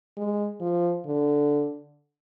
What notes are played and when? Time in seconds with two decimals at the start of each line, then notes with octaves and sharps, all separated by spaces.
0.17 G#3
0.61 F3
1.06 D3